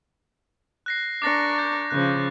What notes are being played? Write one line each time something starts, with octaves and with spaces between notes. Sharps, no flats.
F#6 A#6 C7
D4 A#4 C#6 D6 A6 A#6
G6 A6
C#3 F3 F#6